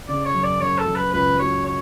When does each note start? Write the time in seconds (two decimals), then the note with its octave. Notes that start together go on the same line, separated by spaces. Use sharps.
0.09 C#3 D5
0.26 C#5
0.35 F#2
0.43 D5
0.60 F#2 C#5
0.78 A4
0.86 F#2
0.96 B4
1.13 C#2 B4
1.39 F#3 C#5
1.66 C#5